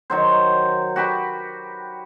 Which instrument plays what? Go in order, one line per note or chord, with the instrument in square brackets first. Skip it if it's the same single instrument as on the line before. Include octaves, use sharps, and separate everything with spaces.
[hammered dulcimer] D#3 F#3 C5
F#4 G4 B4